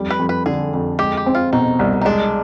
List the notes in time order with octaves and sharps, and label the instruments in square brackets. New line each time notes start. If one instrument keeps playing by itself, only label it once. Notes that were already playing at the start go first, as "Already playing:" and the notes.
Already playing: [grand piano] F2 G3
[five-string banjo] B4
[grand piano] F2
[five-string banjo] B4
[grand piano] D3 [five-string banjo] G#4
[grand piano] F2
[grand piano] G#3 [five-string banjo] G4
[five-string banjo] G4
[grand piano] C4
[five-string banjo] F4
[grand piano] B2 [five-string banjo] D#4
[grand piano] C2
[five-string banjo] D#4
[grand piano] G#3 [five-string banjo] D4